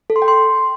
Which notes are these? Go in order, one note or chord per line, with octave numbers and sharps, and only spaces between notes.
A4
C6
G5
C6